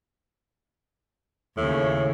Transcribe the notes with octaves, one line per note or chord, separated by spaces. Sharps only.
D#2 A2 C#3